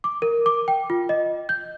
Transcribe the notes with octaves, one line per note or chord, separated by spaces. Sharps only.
D6
A#4
D6
G5
F4
D#5
G6